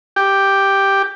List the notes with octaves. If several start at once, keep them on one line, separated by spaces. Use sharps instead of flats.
G4